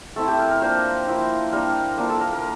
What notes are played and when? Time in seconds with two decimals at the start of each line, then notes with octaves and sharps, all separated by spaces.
0.16 A3 C4 E4 A4
0.28 G4
0.39 A#4
0.51 A#4
0.61 A#3 D4 F4 C5
1.07 F3 A#3 E4
1.53 G3 A#3 D4 A#4
1.98 A#3 D4 F4 A#4
2.09 A4
2.21 A#4
2.33 A#4